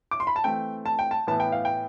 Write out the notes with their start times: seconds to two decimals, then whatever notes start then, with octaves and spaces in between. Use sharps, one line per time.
0.11 D6
0.20 C6
0.27 B5
0.36 A5
0.44 E3 A3 C4 G5
0.86 A5
0.99 G5
1.11 A5
1.27 A2 E3 B3 A5
1.40 G5
1.52 F5
1.65 G5